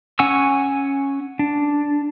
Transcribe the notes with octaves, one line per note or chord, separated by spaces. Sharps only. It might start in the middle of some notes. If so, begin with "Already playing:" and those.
C#4 F#5 G#5 C#6 E6
D4